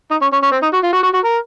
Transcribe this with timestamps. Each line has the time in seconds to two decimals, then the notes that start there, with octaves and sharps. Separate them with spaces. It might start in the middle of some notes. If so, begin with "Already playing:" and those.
0.11 D#4
0.21 C#4
0.32 C#4
0.43 C#4
0.52 C4
0.62 D#4
0.73 F#4
0.84 F4
0.93 F#4
1.03 F#4
1.14 F#4
1.24 A#4